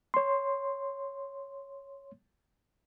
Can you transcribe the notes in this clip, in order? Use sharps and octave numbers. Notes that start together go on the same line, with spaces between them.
C#5 C6